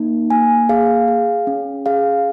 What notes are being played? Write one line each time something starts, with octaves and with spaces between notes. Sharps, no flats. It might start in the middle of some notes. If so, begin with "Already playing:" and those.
Already playing: A#3 D#4
A#3 G#5
G#4 F5
G#4
C#4
G#4 F5